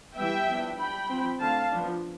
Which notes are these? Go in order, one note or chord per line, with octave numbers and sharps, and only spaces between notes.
E3 G3 B3 E5 G5
F3 B3 D4
G3 D4 G5 B5
F3 C4
D3 A3 C4 F5 A5
F3 B3 D4